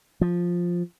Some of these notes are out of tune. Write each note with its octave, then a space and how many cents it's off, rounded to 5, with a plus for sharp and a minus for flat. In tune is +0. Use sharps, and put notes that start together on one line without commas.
F3 +5